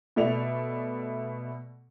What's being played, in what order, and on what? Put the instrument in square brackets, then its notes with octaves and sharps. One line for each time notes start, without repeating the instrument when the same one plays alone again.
[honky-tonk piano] B2 A3 D5 F7